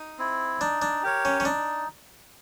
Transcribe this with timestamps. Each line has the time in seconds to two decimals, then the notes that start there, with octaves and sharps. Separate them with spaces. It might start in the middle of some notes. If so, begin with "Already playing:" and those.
Already playing: D#4
0.18 C4 E4
0.61 D4 D#4
0.82 D4
1.03 G4 A#4 C#5
1.25 C#4
1.40 C#4
1.45 D4 D#4